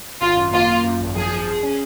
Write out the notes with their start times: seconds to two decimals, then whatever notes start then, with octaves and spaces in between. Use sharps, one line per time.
0.21 G#1 F4
0.36 F#2
0.52 A#3 F4
0.69 A#3
0.84 F#2
1.00 G#1
1.16 F3 G#4
1.32 F3
1.47 G#4
1.63 C#4